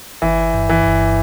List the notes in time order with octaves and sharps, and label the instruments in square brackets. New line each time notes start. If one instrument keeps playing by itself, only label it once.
[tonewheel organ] G1 [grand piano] E3
[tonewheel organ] G2
[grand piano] E3
[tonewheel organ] G1